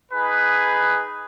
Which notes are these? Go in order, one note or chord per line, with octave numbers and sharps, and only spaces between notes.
D#4 G#4 B4